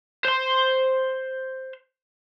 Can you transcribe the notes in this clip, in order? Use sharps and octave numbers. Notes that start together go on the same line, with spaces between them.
C5 C6